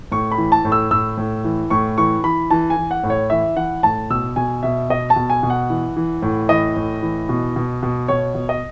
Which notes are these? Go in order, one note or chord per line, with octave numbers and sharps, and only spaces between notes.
A2 C#6
B5
E3
A5
A2
E6
A2 E6
A2
E3
A2 C#6
E3 C#6
E3 B5
E3 A5
G#5
E3
F#5
A2
C#5
E3 E5
E3 F#5
A2 A5
B2 E6
B2 G#5
B2 E5
B2 D#5
A5
B2
G#5
B2
F#5
E3
E3
A2
E3 D#5
A2
E3
B2
B2
B2
B2 C#5
B2
D#5